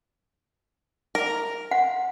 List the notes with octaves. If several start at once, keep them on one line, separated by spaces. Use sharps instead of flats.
A#4
F#5